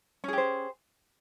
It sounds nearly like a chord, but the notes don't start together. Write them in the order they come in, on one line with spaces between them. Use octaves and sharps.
C#4 G#4 G4 C5